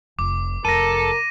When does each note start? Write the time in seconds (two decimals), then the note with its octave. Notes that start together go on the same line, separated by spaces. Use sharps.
0.19 F1 D6
0.65 F1 F2 A4 A#4 A#6 D#7